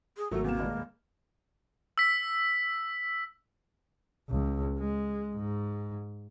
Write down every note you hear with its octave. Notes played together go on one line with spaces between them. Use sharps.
G#4
G#1 F#3 A3 A#3 F#4 A4
E2 C3 A#3 E7
F1 A#1 D#2 G#3
E6 B6
C#2
G#3
G#2